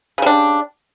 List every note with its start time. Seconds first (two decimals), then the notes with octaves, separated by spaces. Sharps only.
0.18 C#3
0.22 G3
0.26 D4